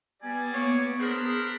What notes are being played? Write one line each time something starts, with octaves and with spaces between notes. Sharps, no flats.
G3 B3 G#4 D5 G#5
A#3 C#5
D4 G#4 A#4 C5 B5